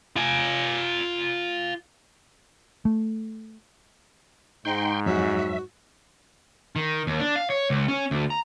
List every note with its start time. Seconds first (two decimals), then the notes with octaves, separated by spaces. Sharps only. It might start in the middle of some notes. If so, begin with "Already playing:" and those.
0.16 F4 G#5
2.85 A3
4.65 G#2 D#4 G5 C6
5.06 F2 F#3 F#4 C#5 E5
6.76 D#3
7.07 D#2
7.20 D4
7.36 F5
7.50 C#5
7.70 C#2
7.88 C#4
8.11 D2
8.30 A#5